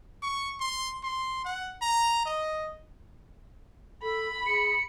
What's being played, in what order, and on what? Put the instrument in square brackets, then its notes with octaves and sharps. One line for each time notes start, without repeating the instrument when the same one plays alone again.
[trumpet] C#6
C6
C6
F#5
A#5
D#5
[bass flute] A4 [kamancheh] B5
[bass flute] G#4 [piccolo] C#7